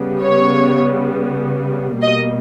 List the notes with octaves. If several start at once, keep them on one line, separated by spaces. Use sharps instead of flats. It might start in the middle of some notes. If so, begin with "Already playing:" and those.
Already playing: C#3 G3 B3
C#5
B2 G3 A#3 D#5